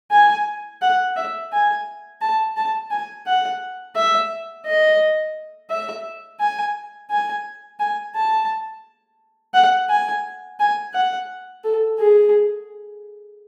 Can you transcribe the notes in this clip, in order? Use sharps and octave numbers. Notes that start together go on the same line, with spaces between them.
G#5
F#5
E5
G#5
A5
A5
G#5
F#5
E5
D#5
E5
G#5
G#5
G#5
A5
F#5
G#5
G#5
F#5
A4
G#4